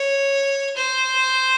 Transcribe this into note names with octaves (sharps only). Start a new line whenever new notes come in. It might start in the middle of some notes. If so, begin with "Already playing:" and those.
Already playing: C#5
C5